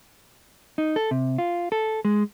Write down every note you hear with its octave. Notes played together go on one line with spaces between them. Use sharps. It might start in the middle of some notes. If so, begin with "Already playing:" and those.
D#4
A4
C3
F4
A4
G#3